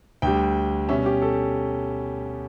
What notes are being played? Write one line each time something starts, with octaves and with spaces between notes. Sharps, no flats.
D2 D3 G3 G5
B2 G3 C#4 E5
G4
A4